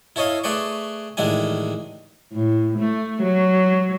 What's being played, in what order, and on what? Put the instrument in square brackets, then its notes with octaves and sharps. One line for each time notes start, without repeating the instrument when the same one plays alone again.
[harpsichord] E4 A4 C#5 D#5 F5
A3 G#4 B4 D5 C#6
A1 D#3 G#3 D4 E4 G#5
[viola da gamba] A2
A3
F#3